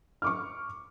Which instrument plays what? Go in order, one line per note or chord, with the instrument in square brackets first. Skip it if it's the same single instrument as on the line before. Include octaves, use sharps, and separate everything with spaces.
[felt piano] C#6 D6 F6